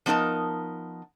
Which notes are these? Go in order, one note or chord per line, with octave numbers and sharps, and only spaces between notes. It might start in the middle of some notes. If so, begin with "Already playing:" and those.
F3 B3 D#4 A#4 A5